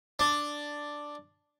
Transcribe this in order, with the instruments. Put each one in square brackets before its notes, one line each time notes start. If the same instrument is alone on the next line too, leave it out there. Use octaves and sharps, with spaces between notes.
[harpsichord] D4